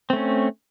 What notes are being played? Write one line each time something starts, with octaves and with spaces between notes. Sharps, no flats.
A3 C4 C#4